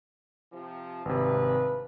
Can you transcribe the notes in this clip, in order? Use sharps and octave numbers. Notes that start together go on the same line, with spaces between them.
C3 F3
G#1 G2 C3 F3 B4